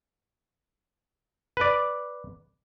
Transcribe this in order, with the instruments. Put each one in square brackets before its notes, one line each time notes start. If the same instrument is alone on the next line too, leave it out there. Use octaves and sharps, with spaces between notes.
[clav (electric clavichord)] B4 D5